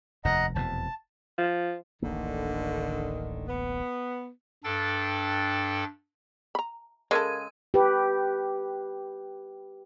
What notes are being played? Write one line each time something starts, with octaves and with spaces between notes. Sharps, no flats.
F1 D#2 D#5 F#5 A#5
F1 E2 B2 A5
F3
D1 A1 D3 D#3 A#3
B3
G2 D4 A4 G5 A6
A#5 B5
C#3 G#3 E4 A4 A#4 G#6 D#7
G4 B4